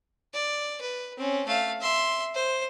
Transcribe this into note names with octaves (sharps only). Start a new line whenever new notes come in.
D5
B4
C4 C#4
A3 F5
E5 C6
C5